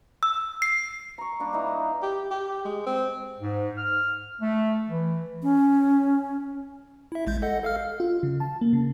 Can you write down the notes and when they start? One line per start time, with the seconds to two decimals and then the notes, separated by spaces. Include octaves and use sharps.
0.23 E6
0.62 C7
1.18 A#5 C#6
1.40 G3 A#3 D4
1.53 E3 D#4 F5 A#5
2.03 G4
2.31 G4
2.65 G#3
2.86 C4
3.39 G#2
3.77 F6
4.39 A3
4.88 E3
5.43 C#4
7.12 E4 E5
7.27 A1 G#3 G6
7.42 A4 D#5 F#5
7.63 A4 F5 F6
8.00 F4
8.23 C#3
8.40 A5
8.61 A#3
8.73 C#3